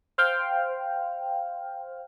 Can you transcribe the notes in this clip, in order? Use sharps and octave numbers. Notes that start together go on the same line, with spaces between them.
C5 F5 G5 F6